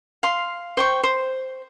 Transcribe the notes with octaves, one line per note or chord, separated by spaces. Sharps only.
F5 C6
C5 G5 C#6
C5